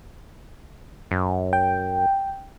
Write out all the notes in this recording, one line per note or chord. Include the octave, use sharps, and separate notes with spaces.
F#2
G5